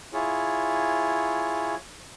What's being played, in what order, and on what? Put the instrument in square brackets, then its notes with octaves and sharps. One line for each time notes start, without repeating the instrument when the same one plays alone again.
[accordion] E4 F4 G#4 C#5